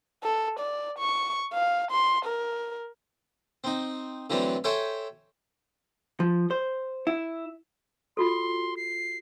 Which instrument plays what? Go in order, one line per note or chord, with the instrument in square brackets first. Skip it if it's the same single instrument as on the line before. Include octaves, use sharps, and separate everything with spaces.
[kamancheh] A4
D5
C#6
F5
C6
A#4
[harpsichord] C4 D#4
D3 E3 F#3 A3 C4 D4
A4 C5 C#5 E5 G5 G#5
[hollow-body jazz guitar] F3
C5
E4
[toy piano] F4 F#4 A4 [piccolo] C6
[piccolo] C7